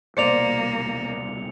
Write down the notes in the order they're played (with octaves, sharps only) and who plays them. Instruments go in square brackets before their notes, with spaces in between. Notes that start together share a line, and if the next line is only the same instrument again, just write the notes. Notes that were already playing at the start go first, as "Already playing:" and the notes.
[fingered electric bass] D#1 C2 B2 [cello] A#3 [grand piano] C5 D5 [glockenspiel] C#7 F7